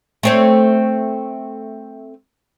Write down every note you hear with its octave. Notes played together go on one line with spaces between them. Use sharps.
A3 C4 C#5